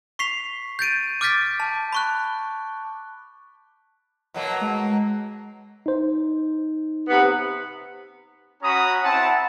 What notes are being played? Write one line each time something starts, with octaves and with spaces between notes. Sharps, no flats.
C#6 B6 C7 F7
G6 A6 D7 D#7
D6 F6 G6 A6 B6 D7
A5
B5 C#6 F#6
B2 F#3 A#3
G#3
D#4 C5
C3 B3
C#4 F#4 A#5 B5 D#6
C4 E4 F#5 A5